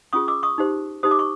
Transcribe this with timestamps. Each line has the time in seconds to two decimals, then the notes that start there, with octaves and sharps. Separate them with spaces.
0.13 C#4 F4 G#4 C#6 D#6
0.28 D6 E6
0.43 C#6 D#6
0.58 D#4 G4 C5
1.03 D#4 G4 C5 D#6
1.11 D6
1.19 C#6